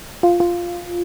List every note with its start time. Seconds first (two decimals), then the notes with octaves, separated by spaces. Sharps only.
0.23 F4
0.40 F4